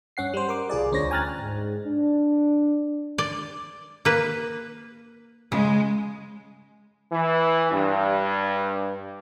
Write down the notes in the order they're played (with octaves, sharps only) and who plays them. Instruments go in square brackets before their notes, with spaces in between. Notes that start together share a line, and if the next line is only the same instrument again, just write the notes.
[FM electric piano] G2 C#4 F#5 C7
G3 C5
A#4 D6
C2 F4 G#4 D5
D2 C#4 D4 C5 C#5 A#6
G5 G#5 A#5 F6 F#6 A6
[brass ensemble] G#2
D4
[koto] D5
A#3 B4
[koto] C#3 [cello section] G#3
[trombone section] E3
G2